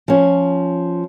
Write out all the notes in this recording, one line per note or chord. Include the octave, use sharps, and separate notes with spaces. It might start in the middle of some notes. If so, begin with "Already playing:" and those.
F3 C#4